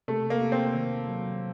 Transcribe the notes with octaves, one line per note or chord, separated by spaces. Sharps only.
C3 A3
A#3
C3
C4
D#3
F#3